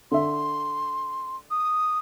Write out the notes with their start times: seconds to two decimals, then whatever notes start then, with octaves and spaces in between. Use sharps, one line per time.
0.11 D3 E5 C6
1.51 D#6